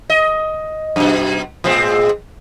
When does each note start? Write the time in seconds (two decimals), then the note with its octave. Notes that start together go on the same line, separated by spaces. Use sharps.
0.10 D#5
0.96 F#2 B2
1.64 A2 G#3 C4